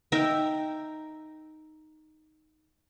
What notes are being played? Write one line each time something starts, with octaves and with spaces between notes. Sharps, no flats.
D#4 A#4 E5 G5